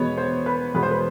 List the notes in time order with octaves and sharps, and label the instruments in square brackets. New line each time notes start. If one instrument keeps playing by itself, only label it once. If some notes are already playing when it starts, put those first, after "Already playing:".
Already playing: [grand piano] E2 B2 G#3 B3 C#5 D#5
C5
B4
E2 B2 G#3 B3 B4
C5
B4